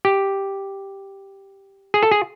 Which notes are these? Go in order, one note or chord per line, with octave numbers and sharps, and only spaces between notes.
G4
G#4
A4
G#4